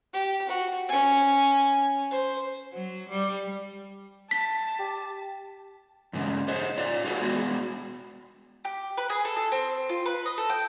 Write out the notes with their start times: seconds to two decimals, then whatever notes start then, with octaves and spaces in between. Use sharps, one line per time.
0.13 G4
0.48 F#4
0.88 C#4 G#5
2.11 C5
2.74 F#3
3.10 G3
4.31 A5 B6
4.79 G4
6.13 E2 G2 C#3 G#3 C#4
6.48 G#4 C5 C#5 D#5
6.77 F4 C#5 D5
7.05 F4 F#4 G#4 B4 D5
7.21 G#3 B3 F#4 G#4
8.65 G4
8.97 B4
9.10 G#4
9.25 A4
9.37 A4
9.52 C4
9.89 F4
10.06 B4
10.26 D#5
10.38 A4
10.50 G5